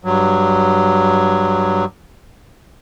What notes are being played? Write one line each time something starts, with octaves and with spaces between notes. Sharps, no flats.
G2 F#3